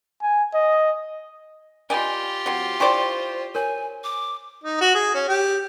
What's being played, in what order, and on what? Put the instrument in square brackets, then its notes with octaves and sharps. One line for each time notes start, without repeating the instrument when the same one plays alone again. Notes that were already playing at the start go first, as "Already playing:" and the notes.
[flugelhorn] G#5
D#5
[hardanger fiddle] F4 G4 [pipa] D5 D#5 G5 [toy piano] G#5 B5
[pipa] F#3 C4
[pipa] E4 D5 [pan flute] C5 [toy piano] G5 C6 C#6
[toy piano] A#4 C#5 [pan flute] G#5
[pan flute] D6
[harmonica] D#4
F#4
G#4
C#4
G4